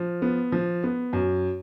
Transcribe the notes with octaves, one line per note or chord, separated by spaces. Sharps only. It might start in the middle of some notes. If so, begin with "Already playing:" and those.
Already playing: F3
B3
F3
B3
F#2